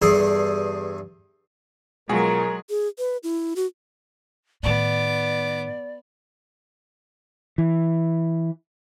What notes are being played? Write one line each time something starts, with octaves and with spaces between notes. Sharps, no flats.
E2 G2 G#4 A4 G#5 C6
B2 F#3 G#3 F4 G#4 A#4
G#4
B4
E4
F#4
A2 D#3 B3 D5 D6
E3